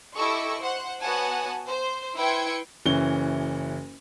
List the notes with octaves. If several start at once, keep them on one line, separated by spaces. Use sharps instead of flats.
E4 G4 A4 D#5 C#6
C5 F#5
B3 F#4 C#5 F#5 G#5 A5
C5
E4 B4 G5 C6 G#6 C#7
F#1 E3 C#4 G7